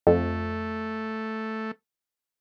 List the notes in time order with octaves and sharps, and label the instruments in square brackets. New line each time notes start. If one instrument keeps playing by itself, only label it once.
[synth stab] F2 [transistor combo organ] A3